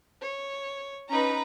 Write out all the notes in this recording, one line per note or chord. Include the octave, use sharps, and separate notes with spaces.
C#5
C#4 D#4 B4 A#5